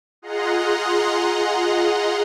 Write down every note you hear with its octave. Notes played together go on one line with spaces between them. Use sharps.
F4 G#4 D#5 F#5 A#5 C6